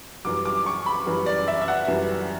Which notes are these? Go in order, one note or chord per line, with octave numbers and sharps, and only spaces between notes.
F#2 E3 G3 D6
D6
C#6
B5
F#2 E3 G3
D5
E5
E5
F#5
F#2 E3 G3